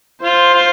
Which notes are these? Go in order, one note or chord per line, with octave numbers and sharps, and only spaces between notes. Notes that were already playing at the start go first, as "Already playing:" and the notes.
F4 C5
F4